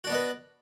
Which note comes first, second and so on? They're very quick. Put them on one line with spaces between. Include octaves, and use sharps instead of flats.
F#4 D4 B3 D#5 B4